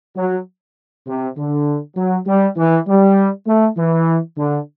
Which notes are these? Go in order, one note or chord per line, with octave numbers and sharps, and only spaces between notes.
F#3
C3
D3
F#3
G3
E3
G3
A3
E3
D3